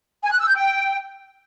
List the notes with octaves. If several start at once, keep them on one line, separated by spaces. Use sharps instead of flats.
G#5
F#6
E6
G6
G5